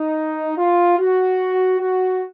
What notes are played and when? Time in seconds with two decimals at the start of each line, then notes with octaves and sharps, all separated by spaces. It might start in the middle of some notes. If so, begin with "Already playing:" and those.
Already playing: D#4
0.58 F4
0.98 F#4
1.80 F#4